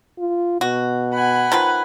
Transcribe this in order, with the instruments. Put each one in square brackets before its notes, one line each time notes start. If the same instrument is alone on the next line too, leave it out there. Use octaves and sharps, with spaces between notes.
[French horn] F4
[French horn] B2 [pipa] F#4
[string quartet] F#5 G#5 B5
[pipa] D#3 F3 B4